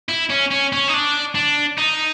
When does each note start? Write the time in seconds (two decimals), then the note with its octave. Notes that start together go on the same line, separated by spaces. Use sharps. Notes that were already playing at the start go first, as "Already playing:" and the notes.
0.09 E4
0.30 C#4
0.51 C#4
0.73 C#4
0.88 D#4
0.94 D4
1.35 D4
1.78 D#4